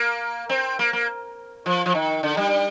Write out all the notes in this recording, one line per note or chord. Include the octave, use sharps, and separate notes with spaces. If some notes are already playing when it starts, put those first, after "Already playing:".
Already playing: A#3
C4
A#3
A#3
F3
F3
D#3
D3
G3